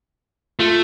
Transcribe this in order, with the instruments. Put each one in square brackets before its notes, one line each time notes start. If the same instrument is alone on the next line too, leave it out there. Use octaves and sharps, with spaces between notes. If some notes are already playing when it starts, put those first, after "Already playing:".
[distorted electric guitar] A3 [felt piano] F4